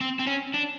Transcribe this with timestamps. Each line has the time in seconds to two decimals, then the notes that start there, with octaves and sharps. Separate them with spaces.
0.01 C4
0.19 C4
0.27 C#4
0.54 D4